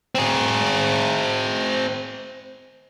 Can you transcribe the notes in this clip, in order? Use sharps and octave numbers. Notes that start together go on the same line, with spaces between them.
C4 G#4